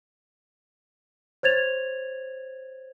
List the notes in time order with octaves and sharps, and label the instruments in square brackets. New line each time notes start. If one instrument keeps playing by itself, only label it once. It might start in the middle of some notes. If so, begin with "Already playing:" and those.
[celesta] C5 C#5 G#6 A6 F7